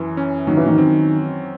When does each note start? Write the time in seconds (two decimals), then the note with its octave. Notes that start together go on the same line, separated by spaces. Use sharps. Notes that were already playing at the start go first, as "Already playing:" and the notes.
Already playing: F#2 E3
0.17 C#4
0.47 D#3 F#3
0.57 E3
0.66 D#3
0.78 C4